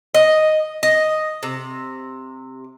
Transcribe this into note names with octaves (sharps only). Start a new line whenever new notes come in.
D#5
D#5
C3